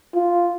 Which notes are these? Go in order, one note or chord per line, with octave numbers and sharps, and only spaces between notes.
F4